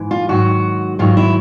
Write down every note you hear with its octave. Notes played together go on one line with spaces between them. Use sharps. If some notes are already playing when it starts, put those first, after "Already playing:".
Already playing: G#2 E3
F4
G#2 D#3 F#3 F#4
G#2 D#3 F#3 F4
E4